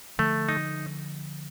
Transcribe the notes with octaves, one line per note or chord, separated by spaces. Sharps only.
D3 F3 A3
D#4